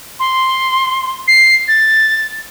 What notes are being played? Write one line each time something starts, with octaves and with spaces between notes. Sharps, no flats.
C6
C7
A6